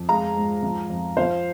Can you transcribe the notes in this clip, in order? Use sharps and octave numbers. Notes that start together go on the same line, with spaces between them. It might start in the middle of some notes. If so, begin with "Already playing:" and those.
Already playing: F2
G#3 F5 A#5
G#2
F3
F2
F3 C5 F5